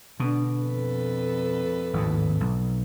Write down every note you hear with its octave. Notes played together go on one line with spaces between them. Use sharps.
B2 D3 D4
F2 A4 B4
G#1 D#2 A2
B1